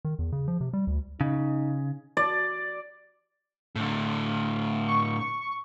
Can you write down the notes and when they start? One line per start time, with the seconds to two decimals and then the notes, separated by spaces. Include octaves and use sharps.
0.05 D#3
0.19 E2
0.32 C#3
0.48 F3
0.61 C3
0.73 G3
0.87 D2
1.21 C#3 D#4
2.17 D5
3.76 A2 D3
4.88 C#6